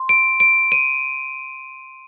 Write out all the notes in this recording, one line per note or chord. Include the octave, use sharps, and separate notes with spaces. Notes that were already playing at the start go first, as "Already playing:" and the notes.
Already playing: C6
D7
D7
D#7